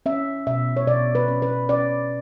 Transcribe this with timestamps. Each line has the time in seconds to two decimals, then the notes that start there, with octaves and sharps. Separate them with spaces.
0.06 C#4 E5
0.47 B2 E5
0.77 C#5
0.87 B2 D5
1.15 B4
1.28 C#4
1.42 B4
1.69 C#4 D5